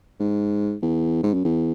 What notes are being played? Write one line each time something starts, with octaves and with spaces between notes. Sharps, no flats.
G#2
E2
G#2
F#2
E2